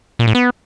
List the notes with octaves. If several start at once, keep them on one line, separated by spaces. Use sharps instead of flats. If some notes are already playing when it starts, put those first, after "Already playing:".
A#2
A2
B3